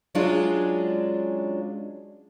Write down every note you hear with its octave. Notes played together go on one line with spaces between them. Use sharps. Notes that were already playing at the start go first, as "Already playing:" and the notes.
F#3 G#3 C#4 D4 F4